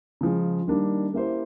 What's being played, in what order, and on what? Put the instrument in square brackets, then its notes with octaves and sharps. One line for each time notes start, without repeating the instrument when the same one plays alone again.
[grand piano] C#3 F3 G#3
D#3 G3 A#3 D4 G4
A#3 C#4 E4 G4 C5